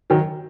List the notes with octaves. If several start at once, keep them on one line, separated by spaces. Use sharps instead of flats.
D#3 F#3